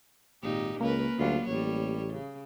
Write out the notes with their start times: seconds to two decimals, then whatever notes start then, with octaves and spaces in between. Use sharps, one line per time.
0.43 G#1 A#2 D#4 G4
0.81 C#2 A#3 C#4 A#4 B4
1.18 D2 F#3 G3 F4
1.48 A1 G3 C#5
2.13 C#3